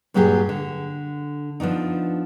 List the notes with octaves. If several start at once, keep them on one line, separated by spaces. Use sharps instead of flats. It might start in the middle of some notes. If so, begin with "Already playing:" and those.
G2 A#2 F#3 G4 G#4
D3
F3 B3 D4 D#4